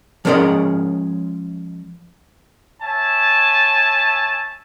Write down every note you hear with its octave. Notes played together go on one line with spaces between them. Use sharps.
F3 G#3 C#4 A#4 D5 D#5
C#5 E5 G#5 A5